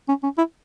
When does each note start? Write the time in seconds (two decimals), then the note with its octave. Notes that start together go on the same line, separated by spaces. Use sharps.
0.09 C#4
0.23 C#4
0.38 E4